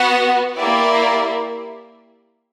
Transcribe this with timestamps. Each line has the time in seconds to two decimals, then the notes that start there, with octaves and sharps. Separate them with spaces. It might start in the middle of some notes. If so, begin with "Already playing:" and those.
Already playing: B3 F#4 F#5
0.57 A#3 E4 G4 D5